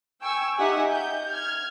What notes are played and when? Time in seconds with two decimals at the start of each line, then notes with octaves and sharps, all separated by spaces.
0.21 G5 G#5 C#6 E6
0.57 D#4 G4 E5 F#5 G#5
0.91 G6
1.31 F6 G#6